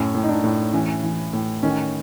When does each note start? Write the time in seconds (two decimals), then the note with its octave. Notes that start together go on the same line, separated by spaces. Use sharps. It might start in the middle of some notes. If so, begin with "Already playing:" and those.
Already playing: F#2 A2 C#4
0.15 A2
0.23 D#4
0.29 D4
0.44 A2
0.73 E3 C#4
1.03 E3
1.33 A2
1.63 D#3 C#4